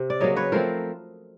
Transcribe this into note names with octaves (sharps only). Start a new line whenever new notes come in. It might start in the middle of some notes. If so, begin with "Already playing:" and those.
Already playing: C3
D5
C#3 F#3 A#3 C#4 C#5 D#5
B4 C#5
F3 A3 C4 A#4 C5